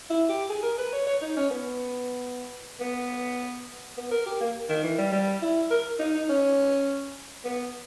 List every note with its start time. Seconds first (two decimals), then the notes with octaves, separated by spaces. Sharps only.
0.10 E4
0.29 G4
0.49 G#4
0.63 A#4
0.78 B4
0.93 C#5
1.07 C#5
1.21 D#4
1.37 C#4
1.51 B3
2.80 B3
3.97 B3
4.11 A#4
4.26 G4
4.40 A#3
4.69 D#3
4.84 E3
4.98 G3
5.12 G3
5.42 E4
5.71 A#4
5.99 D#4
6.15 D#4
6.29 C#4
7.45 B3